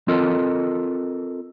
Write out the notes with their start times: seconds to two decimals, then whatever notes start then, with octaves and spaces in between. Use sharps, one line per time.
0.08 C4 F4 A4 A#4 D#5